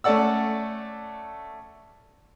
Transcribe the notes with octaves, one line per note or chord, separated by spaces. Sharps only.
A3 C#4 A4 D5 F#5 E6